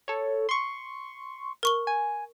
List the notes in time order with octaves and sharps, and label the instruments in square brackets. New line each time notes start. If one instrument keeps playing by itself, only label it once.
[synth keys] A4 C#5
C6 C#6
[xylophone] A#4 C#6 G7
[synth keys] G#5